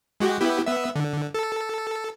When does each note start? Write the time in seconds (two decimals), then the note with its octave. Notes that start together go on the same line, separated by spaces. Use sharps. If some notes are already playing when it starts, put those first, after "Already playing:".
0.20 G#3 F#4 G4
0.40 B3 E4 G4
0.66 B3 E5
0.96 D3
1.34 A4